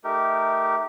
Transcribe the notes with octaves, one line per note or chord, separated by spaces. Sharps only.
A3 D#4 G4 A#4